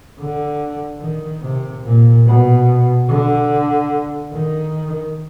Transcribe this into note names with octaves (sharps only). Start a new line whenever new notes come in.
D3
D#3
C3
A#2
B2
D3
D#3